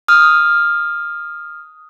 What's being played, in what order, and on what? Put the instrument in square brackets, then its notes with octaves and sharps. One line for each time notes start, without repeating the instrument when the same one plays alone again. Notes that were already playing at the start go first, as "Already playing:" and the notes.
[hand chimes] D#6 F6